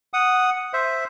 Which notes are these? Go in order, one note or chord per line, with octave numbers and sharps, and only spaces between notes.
F#5 D#6
C5 E5